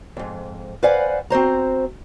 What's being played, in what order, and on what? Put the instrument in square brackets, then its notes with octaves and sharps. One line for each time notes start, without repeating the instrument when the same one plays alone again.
[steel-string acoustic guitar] F2 G#2
B4 C5 D5 F5 F#5 G#5
C4 F#4 C5 A#5